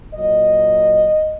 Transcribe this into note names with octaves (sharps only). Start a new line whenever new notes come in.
A#2 F#3 D#5